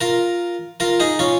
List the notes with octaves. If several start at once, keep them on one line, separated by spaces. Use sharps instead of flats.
F4 A#4
F4 A#4
D#4 G#4
C#4 F4